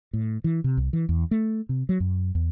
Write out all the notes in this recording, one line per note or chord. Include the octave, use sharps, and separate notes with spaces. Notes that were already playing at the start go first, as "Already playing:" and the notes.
A2
E3
C3
C2
E3
E2
A3
C3
F#3
F#2
E2